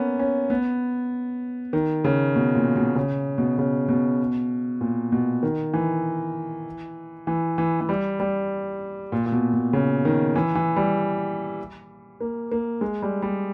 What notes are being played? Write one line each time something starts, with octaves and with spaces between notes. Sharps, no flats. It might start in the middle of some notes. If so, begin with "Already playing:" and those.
Already playing: A#3 B3 C#4
C#4
B3
D#3
C#3
B2
A#2
B2
C#3
B2
C#3
B2
A#2
B2
D#3
E3
E3
E3
E3
G3
G3
A#2
A#2
B2
B2
C#3
D#3
E3
E3
G3
A#3
A#3
G#3
G3
G3